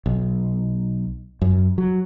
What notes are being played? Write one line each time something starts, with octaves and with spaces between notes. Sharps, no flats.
B1
F#2
F#3